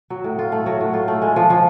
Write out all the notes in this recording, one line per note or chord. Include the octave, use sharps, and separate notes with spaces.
F#3
A2
F4
A3
F#3
A2
F4
A3
G#3
F3
F3